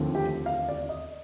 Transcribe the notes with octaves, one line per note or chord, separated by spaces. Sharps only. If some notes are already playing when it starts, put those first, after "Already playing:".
Already playing: D#2 D3 F3 A3 C4
G4
F5
D5
D#5